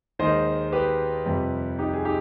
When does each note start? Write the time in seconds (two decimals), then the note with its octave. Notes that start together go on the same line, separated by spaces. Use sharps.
0.19 D#2 D#3 G#3 C5 D#5
0.72 G4 B4
1.26 F2 C3 G3
1.79 D#4 G4
1.94 G#4
2.05 D#4 G4